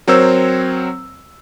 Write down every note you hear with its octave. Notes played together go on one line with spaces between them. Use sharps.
F#3 C4 A#4 C5 C#5 E6